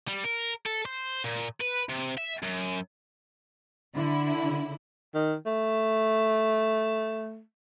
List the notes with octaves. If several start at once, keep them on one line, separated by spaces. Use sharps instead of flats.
G3
A#4
A4
C5
A#2
B4
C3
E5
F#2
D3 E4
D#3
A3